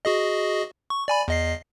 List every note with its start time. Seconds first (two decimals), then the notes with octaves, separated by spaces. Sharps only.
0.05 F#4 G#4 D#5
0.90 C#6
1.08 D5 G#5 B5
1.28 E2 D#5 C7